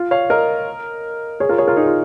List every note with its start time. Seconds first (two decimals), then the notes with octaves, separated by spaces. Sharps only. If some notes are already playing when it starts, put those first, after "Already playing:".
Already playing: F4
0.11 C#5 F5
0.30 A#4 D#5
1.40 G#4 C#5
1.49 F4 A#4
1.58 G#4 C#5
1.68 F4 A#4
1.77 D#4 G#4
1.86 F4